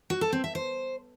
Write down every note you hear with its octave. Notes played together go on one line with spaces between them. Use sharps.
F#4
A4
C4
E5
C5